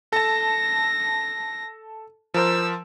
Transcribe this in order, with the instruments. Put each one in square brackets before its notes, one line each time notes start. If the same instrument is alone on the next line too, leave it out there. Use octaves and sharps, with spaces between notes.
[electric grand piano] A4 A5 [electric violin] A#6
[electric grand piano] F3 A#4 C5 [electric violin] E6